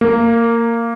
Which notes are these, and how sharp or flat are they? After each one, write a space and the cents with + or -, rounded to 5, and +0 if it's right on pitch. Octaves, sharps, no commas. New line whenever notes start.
A#3 -15